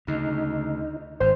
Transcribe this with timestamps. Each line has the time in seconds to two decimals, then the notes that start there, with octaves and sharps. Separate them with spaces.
0.07 D2 C#3 D#4
1.20 G#1 G#2 C5